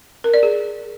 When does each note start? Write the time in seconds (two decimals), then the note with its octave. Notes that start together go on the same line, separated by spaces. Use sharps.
0.24 A#4
0.34 D5
0.43 G#4